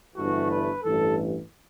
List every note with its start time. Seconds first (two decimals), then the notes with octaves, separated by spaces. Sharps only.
0.15 G1 G2 E3 A3 F#4
0.50 B4
0.84 A1 G2 E3 A4